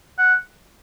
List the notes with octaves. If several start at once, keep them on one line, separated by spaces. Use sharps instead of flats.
F#5